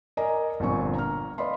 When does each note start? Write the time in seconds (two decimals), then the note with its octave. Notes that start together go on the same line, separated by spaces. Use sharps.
0.17 A#4 D5 D#5 G#5 A#5
0.60 G1 A#2 F3 C4 G#5 C#6
0.95 A#5 F6
1.38 B4 D5 D#5 F5 B5 C6